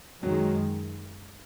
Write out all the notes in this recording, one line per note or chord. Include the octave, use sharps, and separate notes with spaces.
F#2 D#3 F#3 G#3